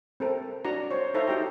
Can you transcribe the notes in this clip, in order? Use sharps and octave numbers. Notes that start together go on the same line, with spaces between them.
C4 A4 A#4
D4 F#4 A#5
C5 C#5
D#4 A4 C5 E5 F5 A#5
D#4 F#4 G4 G5 A#5